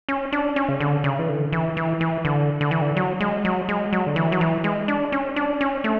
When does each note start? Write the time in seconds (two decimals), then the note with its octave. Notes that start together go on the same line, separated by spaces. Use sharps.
0.09 C#4
0.32 D4
0.56 C#4
0.69 C#3
0.80 D3
1.04 C#3
1.19 E3
1.29 D3
1.53 E3
1.77 E3
2.01 E3
2.25 D3
2.61 D3
2.71 E3
2.81 D3
2.96 F#3
3.20 G#3
3.45 F#3
3.69 G#3
3.93 F#3
4.07 D3
4.16 E3
4.32 F#3
4.41 E3
4.64 G#3
4.88 D4
5.12 C#4
5.36 D4
5.61 C#4
5.84 A3